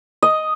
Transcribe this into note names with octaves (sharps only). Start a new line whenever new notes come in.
D#5